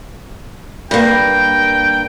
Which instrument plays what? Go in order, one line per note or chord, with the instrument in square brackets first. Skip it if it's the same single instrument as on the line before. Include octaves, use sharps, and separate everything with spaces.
[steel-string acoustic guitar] G2 A#3 [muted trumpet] G5